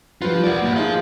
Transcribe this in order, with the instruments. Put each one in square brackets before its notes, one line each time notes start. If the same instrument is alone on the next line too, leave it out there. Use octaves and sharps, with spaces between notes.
[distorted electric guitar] F3 F4 [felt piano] G3 B4
[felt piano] A#4 F#5 [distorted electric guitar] C5 D5
[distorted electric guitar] A#3 E4
[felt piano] D#4 G#4 [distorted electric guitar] C5 F5